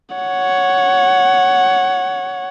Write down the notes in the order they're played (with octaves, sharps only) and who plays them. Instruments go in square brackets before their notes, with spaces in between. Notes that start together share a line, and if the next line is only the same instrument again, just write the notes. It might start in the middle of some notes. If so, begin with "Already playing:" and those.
[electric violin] C#5 F#5